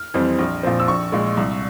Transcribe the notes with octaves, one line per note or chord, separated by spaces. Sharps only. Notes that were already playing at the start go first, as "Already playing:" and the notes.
Already playing: F6
F2 E3 G3 C4
A#1
A#2 F3 C4
E6
A#1 C#6
A#2 G#3
C2